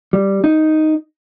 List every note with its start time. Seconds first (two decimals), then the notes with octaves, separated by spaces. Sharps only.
0.13 G3
0.44 D#4